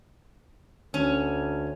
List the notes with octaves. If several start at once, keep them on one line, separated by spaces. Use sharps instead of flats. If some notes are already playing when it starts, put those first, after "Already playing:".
D2 C#4